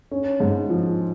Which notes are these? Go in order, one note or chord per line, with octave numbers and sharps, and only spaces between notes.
C#4
G#2
F3